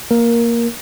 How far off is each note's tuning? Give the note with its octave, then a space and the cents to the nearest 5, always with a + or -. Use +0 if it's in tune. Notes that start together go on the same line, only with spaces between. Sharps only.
A#3 +0 A#4 +10